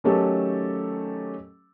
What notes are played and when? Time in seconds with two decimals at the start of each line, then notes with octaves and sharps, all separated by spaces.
0.04 D#3 F#3 A3 C#4 G4 A4